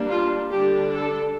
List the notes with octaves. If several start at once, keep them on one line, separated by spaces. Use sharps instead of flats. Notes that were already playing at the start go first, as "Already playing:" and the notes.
Already playing: G3 A#3 D4
F4
D3 G3 D4 G4
A4